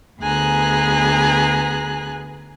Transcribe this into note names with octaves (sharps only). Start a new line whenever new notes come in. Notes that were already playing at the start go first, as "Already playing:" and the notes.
D2 B3 G#4 G#5 A#5 F#6